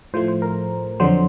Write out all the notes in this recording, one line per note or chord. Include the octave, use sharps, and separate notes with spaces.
A2 F3 A3 C5
C5
A#4
F2 D3 F#3 C5